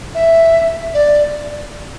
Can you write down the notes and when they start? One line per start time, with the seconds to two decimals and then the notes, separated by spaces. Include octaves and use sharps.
0.15 E5
0.94 D5